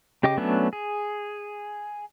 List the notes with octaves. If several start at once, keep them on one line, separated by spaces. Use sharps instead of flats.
C#3 G4 D#5 G5 D6
F#3 A3 B3 C#4 D4
G#4